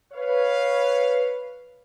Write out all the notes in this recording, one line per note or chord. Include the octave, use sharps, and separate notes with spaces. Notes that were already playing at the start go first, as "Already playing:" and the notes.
B4 C#5 F5